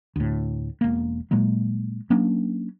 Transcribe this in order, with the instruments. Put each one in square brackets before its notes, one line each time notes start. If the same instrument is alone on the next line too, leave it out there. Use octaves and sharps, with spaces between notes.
[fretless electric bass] D2 A2
E1 A#3
A#2 F#3 G#3 A#3
F#3 A#3 C#4 D4